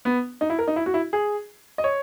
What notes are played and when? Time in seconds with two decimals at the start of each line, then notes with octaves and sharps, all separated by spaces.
0.05 B3
0.41 D#4
0.50 E4
0.59 A#4
0.67 D#4
0.76 E4
0.86 F#4
0.94 E4
1.13 G#4
1.78 D#5
1.84 C#5